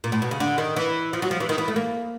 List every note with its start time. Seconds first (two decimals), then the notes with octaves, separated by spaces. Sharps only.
0.04 A#2
0.12 A2
0.22 B2
0.31 C#3
0.40 D3
0.58 D#3
0.76 E3
1.13 F3
1.22 F#3
1.31 F3
1.40 E3
1.49 D#3
1.58 E3
1.68 A3
1.76 A#3